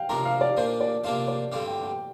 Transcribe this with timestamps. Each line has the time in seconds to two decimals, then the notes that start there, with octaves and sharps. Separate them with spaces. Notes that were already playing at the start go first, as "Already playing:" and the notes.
Already playing: F5 G5
0.09 C3 F3 D4 A#4 A#5
0.25 F5
0.41 D5
0.57 A#2 A#3 D4 C5
0.80 D5
1.04 C3 A#3 D4 F4 C5 F5
1.28 D5
1.51 G2 D3 G3 C4 G4 F5
1.67 G5
1.83 G5